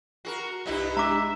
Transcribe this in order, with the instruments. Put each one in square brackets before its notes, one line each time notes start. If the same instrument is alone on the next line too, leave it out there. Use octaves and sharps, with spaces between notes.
[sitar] F#4 G#4 A#4 [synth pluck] C7
[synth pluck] C2 G4 F#6 [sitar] G2 D#4 E4
[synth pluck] G#3 D4 [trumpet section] E5 [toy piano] A#5 D6